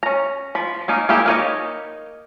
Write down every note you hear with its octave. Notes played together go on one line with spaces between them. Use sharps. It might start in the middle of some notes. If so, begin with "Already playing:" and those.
C#4 A#5
F3 B5
A#3 C#4 D#4
A#3 E4 G4 G#4
A#3 D#4 B4 C#5 D#5